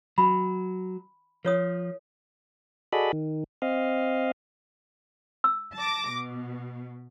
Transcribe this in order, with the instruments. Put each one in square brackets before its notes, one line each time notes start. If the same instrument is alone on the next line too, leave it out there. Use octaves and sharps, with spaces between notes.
[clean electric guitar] F#3 [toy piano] B5
[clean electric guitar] F3 [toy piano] A#4 C#5 D#6
[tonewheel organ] F#4 G#4 A4 D5 D#5 B5
D#3
C4 D#5 F5
[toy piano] E6
[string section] A5 D6 A#6
B2